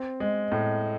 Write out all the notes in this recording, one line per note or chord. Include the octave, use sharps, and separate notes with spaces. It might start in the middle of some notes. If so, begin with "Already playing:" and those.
Already playing: C4
G#3
A2